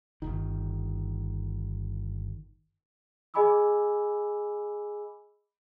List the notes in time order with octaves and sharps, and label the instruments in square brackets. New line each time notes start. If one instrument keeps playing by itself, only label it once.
[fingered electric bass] G1 C2 D#3
[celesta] G#4 D#5 G#5 B5 D6 E6